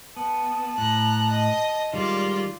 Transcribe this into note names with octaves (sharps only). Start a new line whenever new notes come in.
B3 A5
A2 A#5 F#6
D#5
D#3 G3 G#3 F4 D5